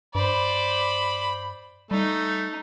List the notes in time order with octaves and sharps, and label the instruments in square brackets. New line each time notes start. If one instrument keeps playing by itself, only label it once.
[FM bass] G2 [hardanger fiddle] C5 D5 [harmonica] B5
[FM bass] G3 [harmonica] A3 [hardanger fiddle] D#4